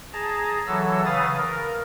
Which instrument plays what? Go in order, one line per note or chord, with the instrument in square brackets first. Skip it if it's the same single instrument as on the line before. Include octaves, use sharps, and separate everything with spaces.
[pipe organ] G#4 A5 A#5
E3 F#3 A4 E6
C#3 B4 F5 D#6 A6
A#4